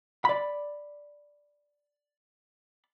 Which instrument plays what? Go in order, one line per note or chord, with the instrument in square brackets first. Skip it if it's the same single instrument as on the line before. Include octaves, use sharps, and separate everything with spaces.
[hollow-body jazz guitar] D5 B5